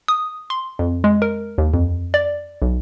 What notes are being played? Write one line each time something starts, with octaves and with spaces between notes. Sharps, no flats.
D#6
C6
F2
G#3
A#4
D#2
F2
D5
B1